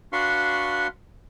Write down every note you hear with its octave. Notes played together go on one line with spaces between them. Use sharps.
D4 F#4 B4 F5 C6 C#6